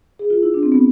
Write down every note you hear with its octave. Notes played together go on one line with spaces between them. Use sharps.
G#4
F4
E4
D4
C4
B3